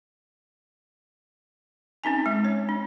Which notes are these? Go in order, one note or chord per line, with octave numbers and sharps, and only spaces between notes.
C4 C#4 D#4 G#5
G#3
C#5
D4